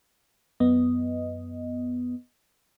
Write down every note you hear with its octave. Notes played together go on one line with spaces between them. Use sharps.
F#2 B3 D#5